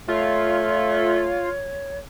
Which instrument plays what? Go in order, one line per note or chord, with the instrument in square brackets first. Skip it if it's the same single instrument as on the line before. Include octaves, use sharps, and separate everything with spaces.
[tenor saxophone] A3 [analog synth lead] F4 [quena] C#5